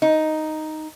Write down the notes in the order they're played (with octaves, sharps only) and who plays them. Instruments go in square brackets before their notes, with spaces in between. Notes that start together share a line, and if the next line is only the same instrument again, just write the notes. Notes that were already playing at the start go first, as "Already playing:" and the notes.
[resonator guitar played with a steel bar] D#4